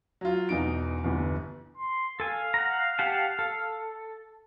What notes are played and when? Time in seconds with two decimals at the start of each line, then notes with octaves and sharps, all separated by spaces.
0.21 F#3 F4
0.49 E1 E2 D#4 D7
1.04 G1 E2
1.77 C6
2.20 A4 F5 G#5
2.54 F#5 A#5
2.99 G4 F#5 A5
3.39 A4